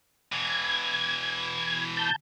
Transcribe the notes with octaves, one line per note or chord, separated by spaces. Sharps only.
B2 E3 G#6
A5 G6